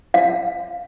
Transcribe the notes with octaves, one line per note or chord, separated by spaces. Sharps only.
F5